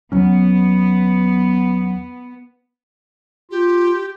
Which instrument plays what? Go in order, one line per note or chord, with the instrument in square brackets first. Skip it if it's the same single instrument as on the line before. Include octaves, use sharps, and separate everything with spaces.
[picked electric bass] D#2 F#3 C#4 [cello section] B3
[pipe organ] F4 [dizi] G4